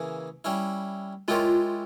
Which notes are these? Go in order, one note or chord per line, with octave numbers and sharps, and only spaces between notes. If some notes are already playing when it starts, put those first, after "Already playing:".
Already playing: C#3 E3 A#3 E4 G#4
G3 C#4 E4
G#3 E4 F4 G4 A#4 C#5